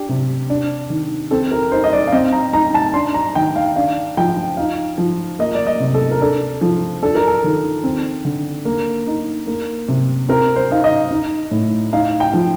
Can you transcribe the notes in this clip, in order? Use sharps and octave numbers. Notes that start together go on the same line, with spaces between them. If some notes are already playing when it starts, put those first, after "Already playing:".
Already playing: D4 G4
C3
D4
D#3
C4 A4
A#4
D#4 C5
D#5
D5
F5
C4 D#5
A#5
D#4 A#5
A5
D4 C6
A#5
D#3 G5
F5
D4 F5
F3 G5
D#4 F5
F3
A#3 D#5
D5
D#5
C3
A4
A#4
D4 A4
F3
D4 A4
A#4
A4
D#3
C4
D3
A#3
D#4
A#3
C3
C4 A#4
C5
D#4 F5
D#5
D#4
A2
D#4 F5
G5
F3